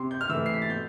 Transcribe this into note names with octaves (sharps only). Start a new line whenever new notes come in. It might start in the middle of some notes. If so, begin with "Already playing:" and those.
Already playing: C3 C6
G6
F6
E3 A3 E6
C7
B6
A6
B2 G6